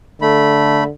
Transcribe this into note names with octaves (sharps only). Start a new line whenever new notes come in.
D3 A3 B5